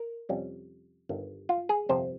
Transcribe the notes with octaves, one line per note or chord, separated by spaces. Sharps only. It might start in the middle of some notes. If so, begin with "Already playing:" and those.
Already playing: A#4
F2 C3 G3 C#4
G1 G2 D#3
F4
G#4
G1 F2 C3 F3 C4 C5